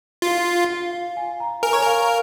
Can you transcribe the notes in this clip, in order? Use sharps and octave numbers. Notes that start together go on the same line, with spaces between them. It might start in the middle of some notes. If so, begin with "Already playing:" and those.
F4
F5
G#5
A#5
A#4 G#5
C#5 A#5
G#5
A#4 F5